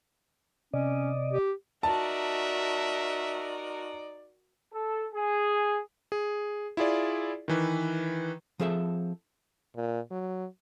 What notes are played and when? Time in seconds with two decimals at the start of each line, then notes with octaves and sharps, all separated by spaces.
0.73 C3 C#4 D5 D#5
1.33 G4
1.83 D#4 F#4 A#4 D5 E5 A5
4.73 A4
5.13 G#4
6.12 G#4
6.77 E4 F4 G#4 D5
7.48 D#3 E3 B4
8.60 F3 C4 G#4 A4 E5
9.76 A#2
10.11 F#3